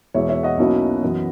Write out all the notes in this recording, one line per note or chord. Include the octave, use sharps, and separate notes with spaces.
E2 B2 G#3 C#5 E5
C#5 E5
D#5 F#5
B1 B2 A#3 C#4 E4
F#2 E3 B3